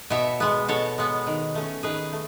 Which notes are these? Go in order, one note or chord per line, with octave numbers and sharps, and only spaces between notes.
B2 C#5 E5
G#3 B3
B2 A4 C#5
G#3 B3
D#3
A3 C#4
D#3 G#4 B4
A3